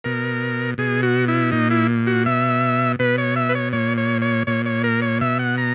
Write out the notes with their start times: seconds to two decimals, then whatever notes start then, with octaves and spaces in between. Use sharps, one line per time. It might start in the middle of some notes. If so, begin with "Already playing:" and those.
0.04 B2 A#4
0.78 B2 G#4
1.03 F#4
1.28 E4
1.52 A#2 D#4
1.70 E4
2.07 F#4
2.26 B2 E5
2.99 B2 B4
3.18 C#5
3.36 E5
3.49 B4
3.55 C#5
3.73 A#2 C#5
3.98 C#5
4.22 C#5
4.47 A#2 C#5
4.66 C#5
4.84 A#4
5.02 C#5
5.21 B2 E5
5.39 F#5
5.58 A#5